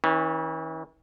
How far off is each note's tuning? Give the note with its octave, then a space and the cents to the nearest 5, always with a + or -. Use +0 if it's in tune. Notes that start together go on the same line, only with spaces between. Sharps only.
E3 -45 C#4 -10